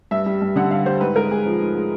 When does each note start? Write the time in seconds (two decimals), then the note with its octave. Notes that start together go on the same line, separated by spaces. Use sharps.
0.11 G2 E5
0.26 G3
0.42 G2
0.56 D3 F#5
0.71 G2 F5
0.86 G3 C5
1.01 G#2 B4
1.16 G#3 A#4
1.31 G#2 G#4
1.46 F3
1.61 G#2
1.76 G#3